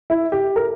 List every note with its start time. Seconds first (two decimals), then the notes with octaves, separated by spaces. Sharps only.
0.10 E4
0.32 G4
0.56 A#4